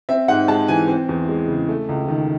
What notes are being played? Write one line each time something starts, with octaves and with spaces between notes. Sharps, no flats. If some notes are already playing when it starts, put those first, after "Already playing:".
C4 E5
G#2 F#5
G#3 A5
E3 G#5
C4
E2
G#3
C#3
A3
C#2
D#3